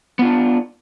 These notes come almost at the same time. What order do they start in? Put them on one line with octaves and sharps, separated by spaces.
B3 F4 D4